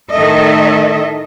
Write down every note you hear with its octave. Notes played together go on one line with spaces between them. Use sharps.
A2 D#3 A4 D#5 E5